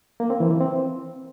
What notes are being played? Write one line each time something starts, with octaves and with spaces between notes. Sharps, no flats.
A#3
C4
E3
E3
C4